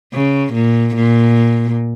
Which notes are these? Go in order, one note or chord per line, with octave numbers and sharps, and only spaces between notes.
C#3
A#2
A#2